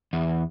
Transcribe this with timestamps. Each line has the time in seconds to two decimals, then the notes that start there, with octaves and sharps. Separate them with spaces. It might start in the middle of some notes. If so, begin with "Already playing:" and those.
0.13 E2